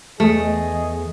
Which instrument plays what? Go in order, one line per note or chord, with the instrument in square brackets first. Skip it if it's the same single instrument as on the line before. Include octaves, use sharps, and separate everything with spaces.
[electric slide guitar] E2 [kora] A3 [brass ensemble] G#4 D#5